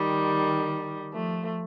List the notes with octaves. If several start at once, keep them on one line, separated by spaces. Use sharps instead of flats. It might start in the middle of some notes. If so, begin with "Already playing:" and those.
Already playing: D#3 G3
F3 A3